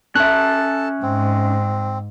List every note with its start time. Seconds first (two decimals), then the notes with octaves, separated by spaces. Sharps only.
0.15 C#4 A4 E5 A5 F#6
1.03 G#2 C4